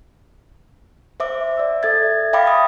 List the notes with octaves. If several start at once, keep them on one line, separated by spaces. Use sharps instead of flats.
C5 E5 D6
D5 E6
A4 E5 G#6 A6
E5 F5 G5 B5 D6
D#6